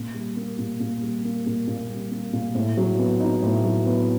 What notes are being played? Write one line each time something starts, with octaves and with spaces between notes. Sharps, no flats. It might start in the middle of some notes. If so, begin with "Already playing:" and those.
Already playing: A#2
G3
A#3
A#2
A#2
G3
A#3
A#2
A#2
G3
A#3
A#2
A2
F#3
B3
D#4
A2
F#3
B3